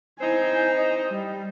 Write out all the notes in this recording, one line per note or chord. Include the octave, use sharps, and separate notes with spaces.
C4 D#4 E4 C5 G#5
D#5
G3